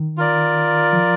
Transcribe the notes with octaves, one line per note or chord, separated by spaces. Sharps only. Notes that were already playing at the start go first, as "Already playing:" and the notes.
Already playing: D#3
F4 A#4 D5
F3